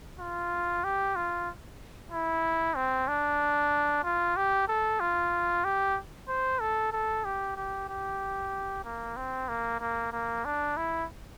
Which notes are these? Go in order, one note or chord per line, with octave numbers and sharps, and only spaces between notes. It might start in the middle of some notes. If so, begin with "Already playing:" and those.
F4
G4
F4
E4
C4
D4
F4
G4
A4
F4
G4
C5
A4
A4
G4
G4
G4
A#3
C4
A#3
A#3
A#3
D4
E4